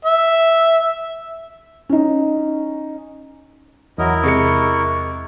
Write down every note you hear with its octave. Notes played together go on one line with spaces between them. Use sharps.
E5
C#4 D#4
E2 F#3 E4 A#4 D#5
C3 G#3 C#6 C#7